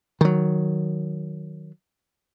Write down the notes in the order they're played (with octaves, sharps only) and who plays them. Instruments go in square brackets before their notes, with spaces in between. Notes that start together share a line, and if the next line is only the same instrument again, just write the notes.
[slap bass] D#3 F#3